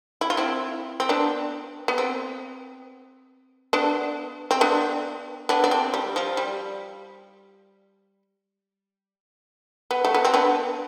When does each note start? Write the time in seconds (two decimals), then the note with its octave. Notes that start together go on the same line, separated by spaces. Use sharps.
0.21 E4
0.30 F4
0.37 C4 E4
1.00 C4
1.09 B3 D4
1.88 B3
1.98 C4
3.73 B3 D4
4.51 C4
4.61 B3 D4
5.49 B3 D4
5.64 D4
5.71 C4
5.94 G3
6.16 F3
6.37 G3
9.91 B3
10.05 A3
10.14 B3
10.25 C4
10.34 B3 D4